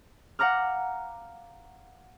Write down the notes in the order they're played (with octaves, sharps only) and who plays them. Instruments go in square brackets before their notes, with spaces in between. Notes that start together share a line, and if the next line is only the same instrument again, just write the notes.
[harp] F5 F#5 A#5 D6 F6